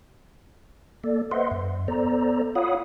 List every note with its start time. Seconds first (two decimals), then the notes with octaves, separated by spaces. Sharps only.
1.04 A#3 A4 D5
1.31 B4 C5 D#5 E5 F#5 C6
1.51 F#2
1.88 B3 A4 C5 D5 A#5
2.55 F4 C#5 F5 F#5 B5 D#6